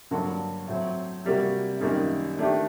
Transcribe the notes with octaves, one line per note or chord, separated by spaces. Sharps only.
G2 D3 F#3 A#3 F#4
A2 F#3 C4
C3 G3 A#3 F#4
F#2 D#3 G3 A#3 D#4
D#3 A3 D4 G4